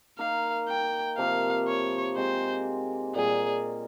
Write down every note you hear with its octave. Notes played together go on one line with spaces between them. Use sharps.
A#3 D#4 A#4 F5
G5
C3 F3 A#3 F5
C#5
G#3 C4 G4 C5
A#2 G3 A#3 G#4